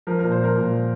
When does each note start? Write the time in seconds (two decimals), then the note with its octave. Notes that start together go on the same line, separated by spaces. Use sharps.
0.07 F3 A#4
0.19 A#2 A#4
0.31 C5
0.40 F3 A#4
0.56 A#2
0.71 F3